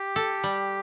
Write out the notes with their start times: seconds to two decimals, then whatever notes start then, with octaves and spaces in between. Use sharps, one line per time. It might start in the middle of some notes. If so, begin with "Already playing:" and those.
Already playing: G4
0.16 A4
0.44 G3